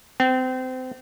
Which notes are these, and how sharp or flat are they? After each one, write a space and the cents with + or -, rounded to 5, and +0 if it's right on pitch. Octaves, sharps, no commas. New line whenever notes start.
C4 -30